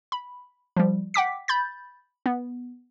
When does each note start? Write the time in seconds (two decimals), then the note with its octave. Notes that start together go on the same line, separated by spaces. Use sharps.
0.12 B5
0.77 F3 G3
1.14 F#5 G5 D6 B6
1.48 B5 G6 A6
2.26 B3